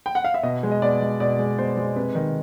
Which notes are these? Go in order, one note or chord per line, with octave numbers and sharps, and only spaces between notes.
G5
F#5
F5
E5
B2 D#5
G#3
D#5
B2 D5
G#3
B2 D5
G#3
B2 C5
G#3
C3 B4
D#3